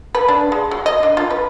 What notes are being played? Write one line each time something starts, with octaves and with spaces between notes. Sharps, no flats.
B4
D4
G#3
F#3
D#5
D4
F4
B4